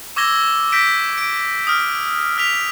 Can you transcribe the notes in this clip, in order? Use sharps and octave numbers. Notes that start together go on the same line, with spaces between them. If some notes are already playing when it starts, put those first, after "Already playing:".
C#6 D6 E6 G#6 A#6 G7
G6 A#6 B6 D7
D7
D#6 F6
F6 B6 F7